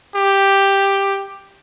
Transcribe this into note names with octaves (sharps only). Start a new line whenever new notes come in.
G4